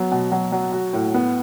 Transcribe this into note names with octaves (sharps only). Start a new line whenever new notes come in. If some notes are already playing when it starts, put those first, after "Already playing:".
Already playing: F#3 B3
B2
F#3
F#3
F#4
A2
B3